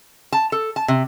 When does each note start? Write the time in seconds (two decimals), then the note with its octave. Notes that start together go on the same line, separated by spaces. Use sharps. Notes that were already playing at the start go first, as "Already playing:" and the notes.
0.32 A5
0.52 A4
0.76 A5
0.88 C3